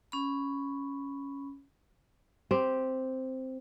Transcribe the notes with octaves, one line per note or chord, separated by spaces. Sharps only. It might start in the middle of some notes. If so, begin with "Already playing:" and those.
C#4 B5
C4 G4